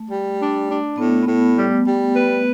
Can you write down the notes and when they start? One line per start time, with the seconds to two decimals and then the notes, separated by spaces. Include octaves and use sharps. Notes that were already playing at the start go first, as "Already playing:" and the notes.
Already playing: A3
0.10 G3
0.39 D4
0.68 D4
0.98 A2 B3
1.09 A3
1.22 A2 B3
1.56 G3
1.86 G3
2.15 B4